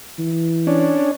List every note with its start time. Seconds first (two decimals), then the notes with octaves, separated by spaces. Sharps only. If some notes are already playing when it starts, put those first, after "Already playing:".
0.19 E3
0.67 C#4 D4